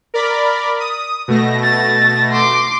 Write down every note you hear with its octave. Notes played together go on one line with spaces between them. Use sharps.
A#4 D5 B5
D#6
B2 A3 A#6
A6
C6 D6